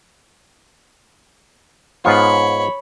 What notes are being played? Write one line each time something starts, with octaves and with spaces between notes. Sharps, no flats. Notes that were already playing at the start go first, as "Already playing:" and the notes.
G#2 B3 F4 C#5 B5